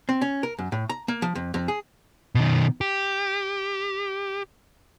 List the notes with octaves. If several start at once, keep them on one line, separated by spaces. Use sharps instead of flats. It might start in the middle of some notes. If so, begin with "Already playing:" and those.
C4
C#4
A#4
F#2
A2
A#5
A#3
F3
F2
F2
G#4
B2 D#3
G4